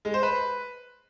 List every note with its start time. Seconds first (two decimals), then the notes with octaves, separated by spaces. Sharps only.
0.05 G#3
0.14 C5
0.23 B4